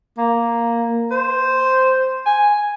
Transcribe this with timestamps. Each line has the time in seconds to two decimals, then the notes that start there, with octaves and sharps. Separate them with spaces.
0.18 A#3
1.11 C5
2.26 G#5